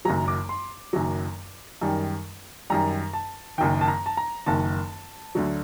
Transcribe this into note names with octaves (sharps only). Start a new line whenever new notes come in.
F#1 F#2 D#3 F#3 A#5
D6
C6
F#1 F#2 D#3 F#3
F#2 D#3 G3
F#2 D#3 G3 A#5
A5
F#1 F#2 D#3 G5
A5
A#5
A5
A#5
F#1 F#2 D#3 A5
D2 D3 F#3